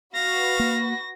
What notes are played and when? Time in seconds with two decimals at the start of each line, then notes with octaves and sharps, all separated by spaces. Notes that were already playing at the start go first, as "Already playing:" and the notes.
0.15 F#4 B4 F5 A#6
0.59 A#3